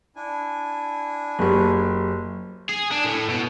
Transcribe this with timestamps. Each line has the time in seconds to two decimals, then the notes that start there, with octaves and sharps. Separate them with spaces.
0.16 D4 E4 G#5
1.39 F#1 F#3 G4 B5
2.69 G#4
2.91 D4
3.04 A2
3.29 B2